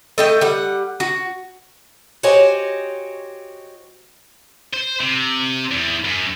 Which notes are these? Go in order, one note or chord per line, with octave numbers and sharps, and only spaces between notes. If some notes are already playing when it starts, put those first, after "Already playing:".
A3 D#5 G5
G3 F#5
F#4
F#4 G4 C5 C#5 D#5 G#5
C5
C3
E2
F#2